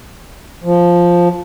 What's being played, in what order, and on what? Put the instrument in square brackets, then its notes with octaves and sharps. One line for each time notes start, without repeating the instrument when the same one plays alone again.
[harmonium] F3